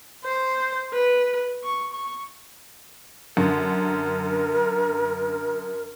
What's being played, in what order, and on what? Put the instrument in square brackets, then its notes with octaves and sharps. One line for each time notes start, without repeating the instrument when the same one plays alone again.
[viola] C5
B4
C#6
C#6
[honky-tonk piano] F#2 D3 [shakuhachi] A#4